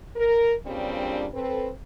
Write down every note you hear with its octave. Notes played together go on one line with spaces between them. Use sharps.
A#4
G2 A#2 C#3 G3 C4 D4
C4 A4 B4